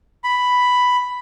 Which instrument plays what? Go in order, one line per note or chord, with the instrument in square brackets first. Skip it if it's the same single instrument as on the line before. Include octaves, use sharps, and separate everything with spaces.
[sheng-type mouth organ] B5